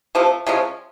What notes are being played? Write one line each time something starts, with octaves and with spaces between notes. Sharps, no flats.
C3 F3 A3
C3 F3 G#3 C#4